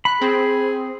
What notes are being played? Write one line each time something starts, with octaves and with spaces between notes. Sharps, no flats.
B5 F#6
C4 G#4